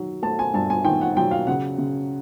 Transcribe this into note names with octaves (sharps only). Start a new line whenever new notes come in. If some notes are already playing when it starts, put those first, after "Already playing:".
Already playing: D#3 F#3
A3 A5
G#5
G2 A5
G#5
D#3 G5
F#5
F#3 G5
F5
C#3 F#5
C#3